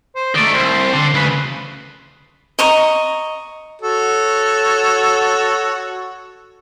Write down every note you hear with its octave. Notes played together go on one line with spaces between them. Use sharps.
C5
D#3 A3 D5
C2 C5
D3 C6
D2 C#3 B4
D#5 A#5 C#6
F#4 A4 C#5